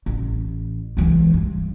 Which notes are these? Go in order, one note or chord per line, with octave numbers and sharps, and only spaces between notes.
A1
E3 G#3
G2